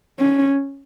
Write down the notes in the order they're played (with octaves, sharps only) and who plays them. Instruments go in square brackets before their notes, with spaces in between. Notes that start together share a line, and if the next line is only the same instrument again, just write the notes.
[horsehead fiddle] C#4